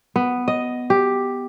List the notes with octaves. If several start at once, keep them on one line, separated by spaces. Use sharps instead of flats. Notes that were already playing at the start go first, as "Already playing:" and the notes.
B3
D#5
G4